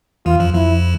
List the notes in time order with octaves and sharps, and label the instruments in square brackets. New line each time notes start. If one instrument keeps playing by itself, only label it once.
[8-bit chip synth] E2 E3 [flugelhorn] F4
[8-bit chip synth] F2 F3
[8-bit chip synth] F2 F3 [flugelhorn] E4